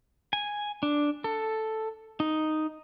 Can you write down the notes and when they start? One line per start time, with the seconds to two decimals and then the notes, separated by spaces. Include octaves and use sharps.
0.33 G#5
0.83 D4
1.24 A4
2.20 D#4